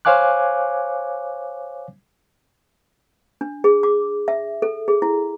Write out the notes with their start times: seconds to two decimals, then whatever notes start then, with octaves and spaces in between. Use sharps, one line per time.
0.05 C5 C#5 F5 G#5 D6 F#6
3.41 D4
3.64 G#4
3.83 D6
4.28 E5
4.62 A4
4.88 G#4
5.02 E4